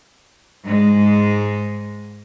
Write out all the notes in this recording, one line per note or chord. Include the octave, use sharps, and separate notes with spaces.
G#2 G#3